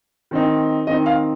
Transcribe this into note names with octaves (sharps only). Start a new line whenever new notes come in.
D#3 C4 D#4
D#3 C4 D#4 D#5
F5